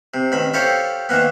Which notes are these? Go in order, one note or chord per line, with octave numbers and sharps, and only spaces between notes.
C3
A1 D#3 B5
E4 F4 G4 A4 C5 C#5
D#3 E3 A#3 B3